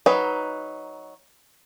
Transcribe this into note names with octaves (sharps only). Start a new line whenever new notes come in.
F#3 D#4 B4